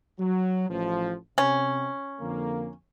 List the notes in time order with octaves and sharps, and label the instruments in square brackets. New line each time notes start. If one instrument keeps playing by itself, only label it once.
[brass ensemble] F#3
A1 F3
[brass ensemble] C3 [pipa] C#4
[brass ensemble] F2 D3 A#3